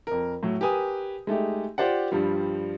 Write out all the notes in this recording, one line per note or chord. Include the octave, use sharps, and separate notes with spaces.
F2 A#4
A2 F#3
G4 A#4 B4 G#5 D#6
G#3 A3 D#4 G4
F4 G4 C5 D5 F#5
G2 F3 G3